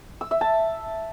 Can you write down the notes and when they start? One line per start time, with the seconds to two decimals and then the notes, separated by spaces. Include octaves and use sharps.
0.21 E6
0.31 E5
0.41 A5